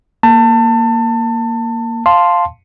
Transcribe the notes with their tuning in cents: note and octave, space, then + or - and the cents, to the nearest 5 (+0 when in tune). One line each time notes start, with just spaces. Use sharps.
A#3 +0 A5 +25
F5 +0 A5 +0 C6 +0